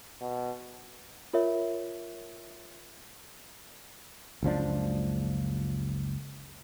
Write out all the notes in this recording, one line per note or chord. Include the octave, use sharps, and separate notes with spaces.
B2
F4 A#4 C#5 E5
F#1 C#2 F3 D4